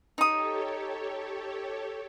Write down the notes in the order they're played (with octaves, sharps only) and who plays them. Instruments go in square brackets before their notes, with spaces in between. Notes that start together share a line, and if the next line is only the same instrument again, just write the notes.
[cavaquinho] D#4 D#6 [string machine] G4 A4 C#5